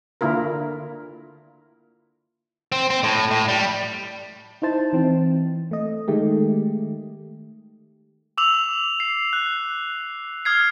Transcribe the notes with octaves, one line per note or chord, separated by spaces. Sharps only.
D3 A#3 E4 F4 A#4
C4
C4
A2
A2
G3
D#4 E4 C5 A5
E3 C4
A3 D#5
D#3 G#3 A3 G4
D6 E6 F7 F#7
C7
F#6
D#6 F6 G#6 C7